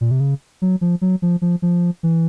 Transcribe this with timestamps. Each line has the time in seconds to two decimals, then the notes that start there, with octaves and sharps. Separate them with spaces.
0.01 A#2
0.11 C3
0.20 C#3
0.62 F#3
0.81 F3
1.01 F#3
1.22 F3
1.42 F3
1.62 F3
2.03 E3